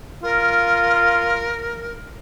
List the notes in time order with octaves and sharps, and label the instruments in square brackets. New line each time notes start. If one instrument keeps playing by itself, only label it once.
[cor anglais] F4 [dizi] A#4